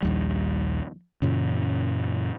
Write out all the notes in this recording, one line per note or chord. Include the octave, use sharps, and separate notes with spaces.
A#1 D#2 G3
F#2 A#2 C#3 E3